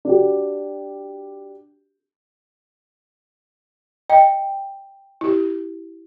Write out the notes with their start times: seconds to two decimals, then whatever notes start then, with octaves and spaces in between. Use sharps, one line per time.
0.05 D4 F#4 G4
4.10 D#5 G5
5.21 E4 G4